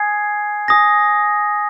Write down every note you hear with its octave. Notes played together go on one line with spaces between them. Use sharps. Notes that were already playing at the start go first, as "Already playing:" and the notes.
Already playing: G#5 D#6 G#6 C7
G#5 D#6 A#6